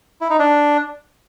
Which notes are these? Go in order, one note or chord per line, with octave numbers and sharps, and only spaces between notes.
E4
D#4
D4